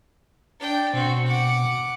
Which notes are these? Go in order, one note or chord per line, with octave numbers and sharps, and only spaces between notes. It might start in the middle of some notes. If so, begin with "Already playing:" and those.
D4 G5
B2 C4 F#4
F#5 D6